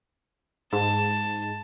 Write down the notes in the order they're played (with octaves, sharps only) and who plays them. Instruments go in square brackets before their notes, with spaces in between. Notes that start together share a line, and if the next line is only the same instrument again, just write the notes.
[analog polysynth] G#2 [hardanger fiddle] A5